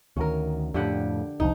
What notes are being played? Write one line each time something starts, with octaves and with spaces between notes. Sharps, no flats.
D2 D#3 C#4 A#4
F2 A2 D3 G4 F#5
F1 C2 F3 D#4